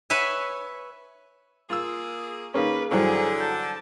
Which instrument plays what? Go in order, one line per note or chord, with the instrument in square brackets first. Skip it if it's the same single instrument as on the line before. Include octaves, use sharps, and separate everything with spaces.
[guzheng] B4 C#5 E5 G#5
[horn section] A#3 G#4 [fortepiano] F4 E6
[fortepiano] D#3 A#3 C#4 [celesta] G#4 F5 [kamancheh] B4
[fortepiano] G2 E3 F#3 [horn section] D3 [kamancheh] G#4 [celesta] C5
[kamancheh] A5 [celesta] G6